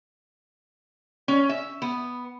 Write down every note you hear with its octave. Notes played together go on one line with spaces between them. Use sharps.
C#4
E5
B3